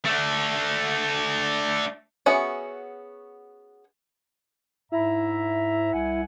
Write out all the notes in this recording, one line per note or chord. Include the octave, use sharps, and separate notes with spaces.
A3 D4
B3 C#4 F#4 G#4 E5
G#2 E4 E5 A#5
C2 F#5 G#5